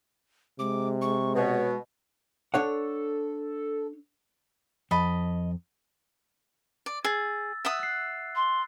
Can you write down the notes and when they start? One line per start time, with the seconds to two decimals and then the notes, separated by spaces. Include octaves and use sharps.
0.59 C3 G#3 D6
1.02 C#6
1.36 B2 C#5
2.54 D4 A4 C#5 F#5
4.91 F2 D#5 A5 B5
6.86 D5
7.05 G#4 E6 A6
7.65 E5 F#5 D#6
7.79 F#6 C7
8.36 C6